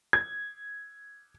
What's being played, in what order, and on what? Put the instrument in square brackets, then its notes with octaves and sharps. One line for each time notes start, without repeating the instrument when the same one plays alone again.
[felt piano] G#6